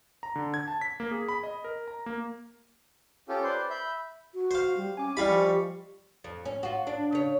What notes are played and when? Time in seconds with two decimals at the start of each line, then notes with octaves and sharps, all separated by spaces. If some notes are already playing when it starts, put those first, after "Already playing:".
0.23 A#5
0.36 D3
0.54 G#6
0.68 A5
0.81 B6
1.00 A#3
1.11 G#4
1.29 B5
1.43 D#5
1.64 A#4
1.88 A#5
2.06 A#3
3.29 C#4 F4 G4 A4
3.44 B4 C5 D5 C6
3.70 E5 B5 G6
4.34 F#4
4.51 C5 F5
4.77 G3
4.97 C#4 G#5 D6
5.17 G3 E4 G4 D#5 F5 B5
5.28 F3 C#6 C#7
6.24 F2
6.45 C#4
6.63 F4 F#4
6.87 D4
7.12 C#3 C#5